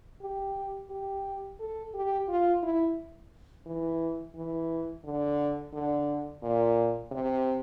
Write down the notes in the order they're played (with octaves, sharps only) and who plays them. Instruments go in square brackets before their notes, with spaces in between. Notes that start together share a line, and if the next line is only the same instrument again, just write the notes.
[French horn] G4
G4
A4
G4
F4
E4
E3
E3
D3
D3
A#2
C3